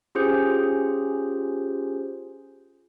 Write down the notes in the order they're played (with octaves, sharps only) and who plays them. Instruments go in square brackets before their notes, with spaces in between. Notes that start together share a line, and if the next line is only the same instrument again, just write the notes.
[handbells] C#4 F4 G4 G#4 C5